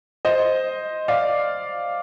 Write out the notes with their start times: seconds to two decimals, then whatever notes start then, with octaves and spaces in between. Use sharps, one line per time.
0.25 C5 D#5
1.08 D5 F5